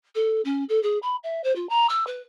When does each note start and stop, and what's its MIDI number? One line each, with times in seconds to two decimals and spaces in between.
0.15 0.41 69
0.45 0.64 61
0.69 0.81 69
0.83 0.98 68
1.02 1.16 83
1.23 1.41 76
1.44 1.54 72
1.55 1.68 65
1.69 1.86 82
1.89 2.04 88
2.07 2.21 71